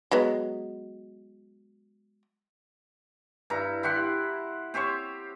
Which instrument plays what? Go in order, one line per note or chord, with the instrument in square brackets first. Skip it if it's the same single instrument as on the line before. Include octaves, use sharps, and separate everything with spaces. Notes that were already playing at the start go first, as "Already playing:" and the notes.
[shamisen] F#3 G#3 B3
[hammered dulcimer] G2 E4 A#5
E4 G4 F#5 C6
C4 G4 C5 C#5